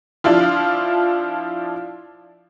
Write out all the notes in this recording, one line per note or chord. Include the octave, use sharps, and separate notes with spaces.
F3 D4 E4 F4